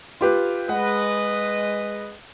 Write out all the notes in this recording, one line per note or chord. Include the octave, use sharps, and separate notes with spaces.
F4 G4 B4
G#3 B4 D#5 F#5